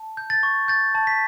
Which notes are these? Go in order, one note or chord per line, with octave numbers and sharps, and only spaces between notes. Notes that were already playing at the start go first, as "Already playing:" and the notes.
Already playing: A5
G6
A6
C#6
G6 A6
A5
B6